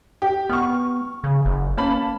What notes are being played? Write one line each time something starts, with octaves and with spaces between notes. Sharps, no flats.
G4
B3 C#6 F6
C#3
F#1
A#3 C#4 A5 B5